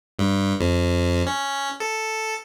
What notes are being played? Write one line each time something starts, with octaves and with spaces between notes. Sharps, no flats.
G2
F2
C#4
A4